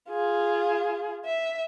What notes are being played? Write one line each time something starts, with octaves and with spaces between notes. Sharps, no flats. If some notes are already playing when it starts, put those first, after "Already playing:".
F4 G#4
E5